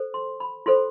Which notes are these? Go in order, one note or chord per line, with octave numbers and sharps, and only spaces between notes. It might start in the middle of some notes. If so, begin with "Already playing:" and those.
Already playing: A4 C5
C6
B5
F4 A4 C5 C6